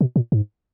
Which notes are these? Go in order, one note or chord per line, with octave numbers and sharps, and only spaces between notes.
B2
A#2
G#2